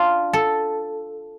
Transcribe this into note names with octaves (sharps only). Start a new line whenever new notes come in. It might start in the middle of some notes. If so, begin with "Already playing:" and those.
Already playing: D4 F4
A4